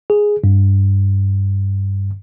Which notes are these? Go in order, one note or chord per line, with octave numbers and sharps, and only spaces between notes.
G#4
G2